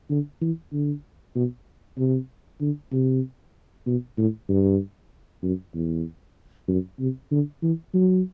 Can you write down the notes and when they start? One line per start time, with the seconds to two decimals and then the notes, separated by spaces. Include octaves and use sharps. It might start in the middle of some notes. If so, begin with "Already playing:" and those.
0.10 D3
0.41 E3
0.73 D3
1.35 B2
1.98 C3
2.61 D3
2.92 C3
3.86 B2
4.18 A2
4.49 G2
5.42 F#2
5.75 E2
6.68 F#2
6.99 C3
7.31 D3
7.62 E3
7.93 F#3